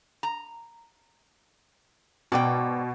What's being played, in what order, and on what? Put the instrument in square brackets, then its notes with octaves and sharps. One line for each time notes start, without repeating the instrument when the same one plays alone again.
[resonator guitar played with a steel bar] A#5
[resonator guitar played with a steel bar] G#2 D5 G5 [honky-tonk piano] B2